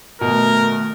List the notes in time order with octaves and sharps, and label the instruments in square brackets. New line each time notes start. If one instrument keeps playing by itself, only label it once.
[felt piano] B2 [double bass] D#3 A3 [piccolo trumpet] A#4